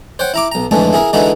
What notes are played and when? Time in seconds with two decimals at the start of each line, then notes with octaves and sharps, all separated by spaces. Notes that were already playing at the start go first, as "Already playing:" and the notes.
0.19 C5 C#5 F#5 G5
0.34 E4 A#5 D6
0.52 B1 A#5
0.71 F2 G#2 D3 E3 G#3 A3
0.93 E4 G#4 A#4
1.13 D3 E3 G#3 D#4 E4 F#4